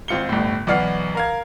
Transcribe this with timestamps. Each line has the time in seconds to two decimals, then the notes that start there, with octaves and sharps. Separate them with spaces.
0.08 G#1 C4 F4 C#7 G7
0.29 G1 A2
0.67 B1 E3 D5 F#5 F6 C7
1.15 A#4 F5 G#6